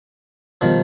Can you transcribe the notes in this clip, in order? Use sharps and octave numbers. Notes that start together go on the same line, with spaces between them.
B2 D#3 F3 G3